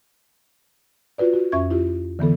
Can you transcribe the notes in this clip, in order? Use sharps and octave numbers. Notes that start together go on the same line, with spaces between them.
F4 F#4 B4 D5
F#4
F2 C#4 E5 C#6 G#6
E4 F4 G4
D3 E3 B3 A4